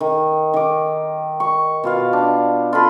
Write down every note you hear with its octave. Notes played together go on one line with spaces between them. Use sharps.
D#3
D#3 D6
C#6
B2 F4 F5
D4
F4 A4 B5 C6